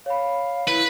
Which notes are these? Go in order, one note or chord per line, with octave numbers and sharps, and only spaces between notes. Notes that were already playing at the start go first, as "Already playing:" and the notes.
C#5 F5 B5
E4 B4